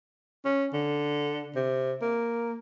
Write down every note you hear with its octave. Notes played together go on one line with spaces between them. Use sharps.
C#4
D3
C3
A#3